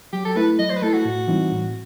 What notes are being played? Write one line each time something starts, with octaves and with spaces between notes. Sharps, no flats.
F#3 G4
A4
A3 E4 B4
F#3 D#5
C5
B4
A3 E4 A4
F#4
A2
E3 G3 C4 D#4
A2